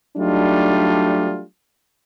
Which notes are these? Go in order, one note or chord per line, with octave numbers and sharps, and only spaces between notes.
F#3 G3 A3 D4 D#4 F4